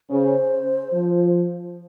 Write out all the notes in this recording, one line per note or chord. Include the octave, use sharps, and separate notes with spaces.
C#3 C5
F3